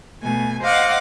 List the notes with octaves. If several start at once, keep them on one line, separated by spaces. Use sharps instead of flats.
B2 A3 G#5
C5 D#5 F5 F#5 D6